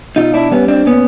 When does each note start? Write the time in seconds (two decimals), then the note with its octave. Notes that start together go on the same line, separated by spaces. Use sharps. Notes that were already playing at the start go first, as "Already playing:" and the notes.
0.16 B2 D#4 F4
0.34 D4 E4
0.51 G3 B3 C#4
0.68 C4 D4
0.86 A#2 B3 C#4